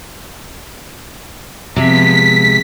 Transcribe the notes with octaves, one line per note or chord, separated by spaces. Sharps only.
C3 F3 G#3 B3 B6